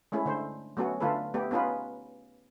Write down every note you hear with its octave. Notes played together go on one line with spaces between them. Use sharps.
G#3 A3 C#4 E4
D3 A3 C5
F#3 A3 B3 C#4 F#4
D3 A3 F4 A4 B4
A3 B3 G4
B3 C#4 D#4 F4 B4